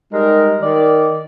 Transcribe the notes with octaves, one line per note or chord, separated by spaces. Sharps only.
G3 G#3 D#4 A#4
D#3 D5